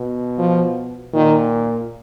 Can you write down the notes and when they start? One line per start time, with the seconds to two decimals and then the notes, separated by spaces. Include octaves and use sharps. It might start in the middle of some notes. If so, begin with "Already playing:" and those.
Already playing: B2
0.38 F3
1.13 A#2 D#3